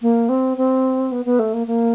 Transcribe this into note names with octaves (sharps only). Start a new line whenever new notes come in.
A#3
C4
C4
B3
B3
A3
A#3
A#3